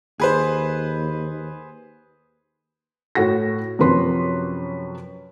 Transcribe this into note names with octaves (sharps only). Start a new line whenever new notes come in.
D#2 G#4 B4 C5
A2 F#4 A#6
F#2 C3 F3 B4 C6